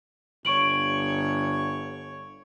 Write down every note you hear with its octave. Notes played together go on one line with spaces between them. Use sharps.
G1 C#5 C#6 D7 F#7